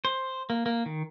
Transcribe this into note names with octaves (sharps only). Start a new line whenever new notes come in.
C5
A#3
A#3
D#3